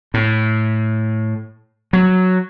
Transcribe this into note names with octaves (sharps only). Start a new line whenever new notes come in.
A2
F#3